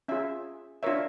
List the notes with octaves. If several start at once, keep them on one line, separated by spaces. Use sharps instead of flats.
C#4 F4 G#4 E5
D4 F4 A#4 C#5 E5